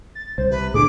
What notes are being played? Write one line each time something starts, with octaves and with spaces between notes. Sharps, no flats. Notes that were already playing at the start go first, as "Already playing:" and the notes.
A6
C2 C5
C3 B4
A2 D3 G#4 D6